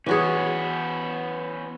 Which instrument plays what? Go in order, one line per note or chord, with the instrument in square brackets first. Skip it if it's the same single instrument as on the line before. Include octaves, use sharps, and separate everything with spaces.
[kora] E3 F#4 G#4 [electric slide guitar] B3 C#4